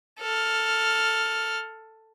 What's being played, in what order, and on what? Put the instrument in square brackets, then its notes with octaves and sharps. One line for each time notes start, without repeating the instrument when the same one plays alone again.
[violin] A4 F6